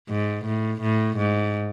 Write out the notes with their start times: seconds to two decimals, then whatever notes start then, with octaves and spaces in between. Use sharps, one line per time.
0.09 G#2
0.46 A2
0.81 A2
1.18 G#2